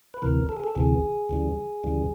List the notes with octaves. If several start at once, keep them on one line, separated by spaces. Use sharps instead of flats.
B4
D2 C3 E3 A#4
A4
G#4
A4
D2 C3 E3 G#4
D2 C#3 E3 G3
D2 C#3 E3 G3